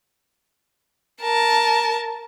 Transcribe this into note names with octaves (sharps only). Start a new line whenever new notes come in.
A#4 A5